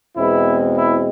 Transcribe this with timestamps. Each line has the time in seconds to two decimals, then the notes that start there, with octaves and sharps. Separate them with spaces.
0.15 E2 B2 G#3 C4 E4
0.75 E4